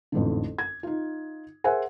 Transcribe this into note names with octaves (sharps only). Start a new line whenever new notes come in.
A1 F2 G#2 D3
G#6
D#4 F4
G#4 A#4 C5 E5 F#5 G#5